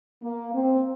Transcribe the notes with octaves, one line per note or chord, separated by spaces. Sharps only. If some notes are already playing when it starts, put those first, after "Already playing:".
A#3
C4